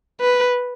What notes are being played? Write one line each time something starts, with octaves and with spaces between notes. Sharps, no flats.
B4